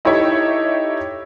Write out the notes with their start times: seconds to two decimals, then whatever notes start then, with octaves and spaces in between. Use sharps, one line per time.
0.05 D#4 E4 G4 A4 C#5 E5